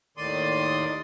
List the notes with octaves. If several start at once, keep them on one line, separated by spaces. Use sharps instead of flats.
D#2 A2 D#3 D5 C6 D#6